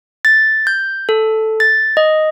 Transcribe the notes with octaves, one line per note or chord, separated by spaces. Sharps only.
A6
G6
A4
A6
D#5